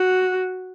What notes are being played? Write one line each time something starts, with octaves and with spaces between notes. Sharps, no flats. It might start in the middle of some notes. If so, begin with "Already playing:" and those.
Already playing: F#4